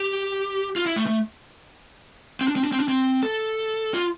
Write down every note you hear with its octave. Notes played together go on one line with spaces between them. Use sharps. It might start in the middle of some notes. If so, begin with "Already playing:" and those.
Already playing: G4
F4
E4
A3
A3
C4
D4
C4
D4
C4
D4
C4
A4
F4